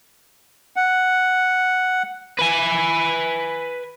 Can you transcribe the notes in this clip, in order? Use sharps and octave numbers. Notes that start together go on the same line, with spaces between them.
F#5
B4 G#5